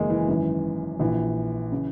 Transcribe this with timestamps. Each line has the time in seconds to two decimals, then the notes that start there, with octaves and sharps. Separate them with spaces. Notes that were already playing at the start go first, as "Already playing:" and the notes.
Already playing: F#1 E2 D#3 G#3 A#3
0.10 E3
0.28 G#1 F#2 E3
0.99 A#1 A#2 E3
1.72 C#3 E3